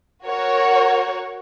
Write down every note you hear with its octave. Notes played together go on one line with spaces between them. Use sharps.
F#4 A#4 C#5 F#5